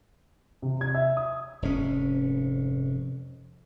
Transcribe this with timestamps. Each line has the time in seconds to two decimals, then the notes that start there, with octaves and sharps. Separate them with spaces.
0.62 C3
0.81 G#6
0.95 E5
1.17 D#6
1.62 F1 G#2 C#4